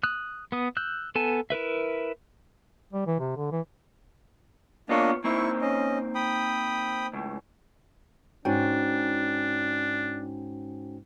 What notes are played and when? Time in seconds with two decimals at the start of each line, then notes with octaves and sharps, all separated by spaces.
0.03 D#6 F#6
0.52 B3 D#6
0.77 E6 F#6 G6
1.15 B3 A4 G#5 A5
1.50 E4 A#4 B4 E5
2.93 G3
3.07 E3
3.19 C3
3.37 D3
3.52 E3
4.89 A#3 B3 D4 F4 C#5 D#5
5.24 A#3 C4 D#4 E4 C#6
5.62 C#4 D#5
6.15 G5 B5 D#6
7.13 C#2 A2
8.45 G#2 C#4 D4 F#4 G5